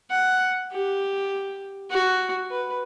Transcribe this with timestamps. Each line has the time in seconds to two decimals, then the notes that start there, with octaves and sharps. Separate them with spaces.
0.10 F#5
0.72 G4
1.90 F#4
2.50 B4